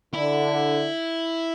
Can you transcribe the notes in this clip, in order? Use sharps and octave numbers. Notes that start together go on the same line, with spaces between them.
D3 E4